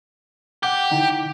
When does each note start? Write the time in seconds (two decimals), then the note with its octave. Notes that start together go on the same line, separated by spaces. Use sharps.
0.63 G4 F#5 D6 G6
0.91 D3 D#4 E4